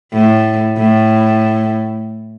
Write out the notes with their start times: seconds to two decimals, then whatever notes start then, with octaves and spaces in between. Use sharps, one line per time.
0.13 A2
0.77 A2